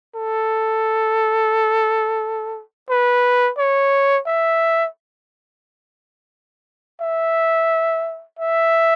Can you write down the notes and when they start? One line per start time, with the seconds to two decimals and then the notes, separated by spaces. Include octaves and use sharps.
0.15 A4
2.89 B4
3.58 C#5
4.26 E5
7.01 E5
8.39 E5